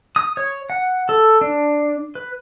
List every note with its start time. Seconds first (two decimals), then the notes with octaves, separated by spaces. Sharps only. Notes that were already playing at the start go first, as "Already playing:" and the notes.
0.16 D#6
0.37 C#5
0.70 F#5
1.09 A4
1.41 D4
2.15 B4